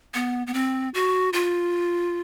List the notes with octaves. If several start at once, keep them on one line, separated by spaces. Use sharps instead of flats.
B3
B3
C4
F#4
F4